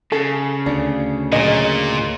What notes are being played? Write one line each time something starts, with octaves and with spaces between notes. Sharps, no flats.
C#3 A4
D2 D4
A#2 F#3 G#4 D#5